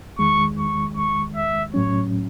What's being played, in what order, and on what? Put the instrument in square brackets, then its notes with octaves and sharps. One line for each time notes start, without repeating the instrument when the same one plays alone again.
[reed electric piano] E2 D#3 G#3 [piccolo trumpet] C#6
[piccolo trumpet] C#6
C#6
E5
[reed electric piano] A2 F#3 C#4 [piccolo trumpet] C#5